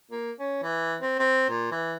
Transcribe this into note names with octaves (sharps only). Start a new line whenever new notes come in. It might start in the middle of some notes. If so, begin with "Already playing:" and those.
A#3
C#4
E3
C4
C4
A#2
E3